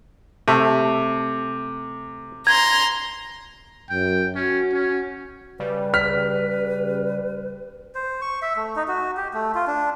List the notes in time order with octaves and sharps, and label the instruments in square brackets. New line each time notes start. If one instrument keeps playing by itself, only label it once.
[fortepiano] C3 [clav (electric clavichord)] A3
[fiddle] A#5 C6 [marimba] G#6
[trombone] F#2 [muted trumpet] G5
[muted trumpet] C#4 [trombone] F#4
[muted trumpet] C#4
[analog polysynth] C#3 G3 [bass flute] B4
[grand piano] F6 B6
[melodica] C5
C#6
E5
A3
D#4
F#4
G4
A3
F4
D4